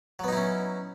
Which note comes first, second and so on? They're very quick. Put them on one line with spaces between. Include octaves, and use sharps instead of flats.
F#3 B3 D#4 E4 C#4